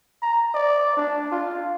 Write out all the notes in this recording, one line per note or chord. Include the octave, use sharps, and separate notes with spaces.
A#5
D5
D4
F4